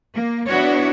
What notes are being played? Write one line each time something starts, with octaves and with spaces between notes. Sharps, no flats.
A#3
B3 D4 E4 F#4 C#5